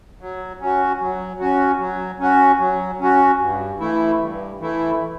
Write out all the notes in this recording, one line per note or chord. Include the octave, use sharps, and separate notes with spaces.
F#3
C#4 F#4
F#3
C#4 F#4
F#3
C#4 F#4
F#3
C#4 F#4
G2
E3 A3 E4
G2
E3 A3 E4